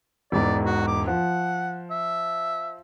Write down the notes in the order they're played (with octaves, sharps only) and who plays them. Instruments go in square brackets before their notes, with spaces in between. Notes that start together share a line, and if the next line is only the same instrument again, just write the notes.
[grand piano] E1 E2 G#2 [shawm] D5
[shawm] F#4
D6
[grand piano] F3 [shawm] F#5
[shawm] E5